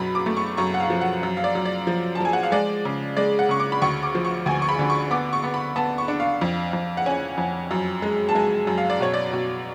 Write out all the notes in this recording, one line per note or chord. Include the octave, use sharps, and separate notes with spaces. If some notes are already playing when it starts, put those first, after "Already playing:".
Already playing: F#2 B2 B5
D6
A3
C#6
F#2 C#6
F#5
F5
F3
F#5
F#2
F5
D5
F#2
D5
F3
A5
F3 G#5
F#5
F5
G#3 D5
C#3
G#3 D5
F#5
C#3 C#6
D6
B5
D2 C#6
D6
F3
C#6
D2 G#5
C#6
B5
D3
C#6
B3 D6
C#6
B3
B5
B3 A5
C#6
D4
F5
F2
F2
F#5
C#4 G#5
F2
F#2
G#3
A5
G#3 G#5
F#2
F5
D5
B2 C#5
D5
B2